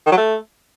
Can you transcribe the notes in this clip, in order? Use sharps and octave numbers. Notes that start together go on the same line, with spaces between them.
D#3
F#3
A3